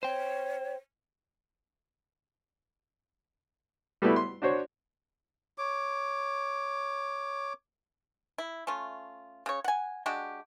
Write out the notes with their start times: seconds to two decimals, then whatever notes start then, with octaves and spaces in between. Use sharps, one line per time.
0.03 C5 C#5 G5
4.02 G3 A3 B3 E4 F#4
4.16 C6
4.42 D4 F#4 C5 C#5
5.58 C#5 D6
8.38 E4
8.67 A3 C#4 F4
9.46 C#3 C#5
9.64 F#5 G#5
10.06 G#3 D4 F#4 G4